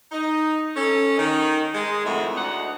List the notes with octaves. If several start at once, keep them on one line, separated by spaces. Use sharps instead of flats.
D#4
C#4 A4
D#3 D#4
G#3 G#4
F2 A2 D#3 D#4 F#4 E5
D2 D#4 F#5